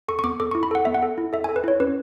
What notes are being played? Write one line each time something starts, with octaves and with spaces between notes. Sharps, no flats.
A4 C#6
C#6
B3 D6
A4 D6
C#6
E4
B5
A4 F#5
B3 E5
F#5
A4
E4
A4 E5
G#5
A4
B4
E4 C#5
C#4 B4